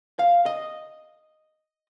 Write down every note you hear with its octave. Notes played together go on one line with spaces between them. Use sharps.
F5
D#5